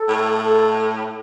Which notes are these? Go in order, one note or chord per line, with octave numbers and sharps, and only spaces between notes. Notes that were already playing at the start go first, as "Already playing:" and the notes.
Already playing: A4
A2
A4